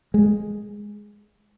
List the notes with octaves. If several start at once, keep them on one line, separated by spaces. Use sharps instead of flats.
G#3